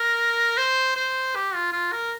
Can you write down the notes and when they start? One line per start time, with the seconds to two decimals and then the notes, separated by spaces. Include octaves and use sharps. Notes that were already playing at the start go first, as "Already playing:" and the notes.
Already playing: A#4
0.58 C5
0.96 C5
1.35 G4
1.55 F4
1.73 F4
1.92 A#4